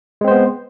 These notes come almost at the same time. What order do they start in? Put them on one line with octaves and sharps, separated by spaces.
G#3 C4 C5 B3